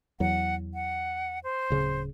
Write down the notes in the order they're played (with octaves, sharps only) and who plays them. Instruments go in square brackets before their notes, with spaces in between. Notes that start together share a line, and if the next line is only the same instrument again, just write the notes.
[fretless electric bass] E2 F#3 [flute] F#5
[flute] F#5
C5
[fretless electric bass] D1 C#3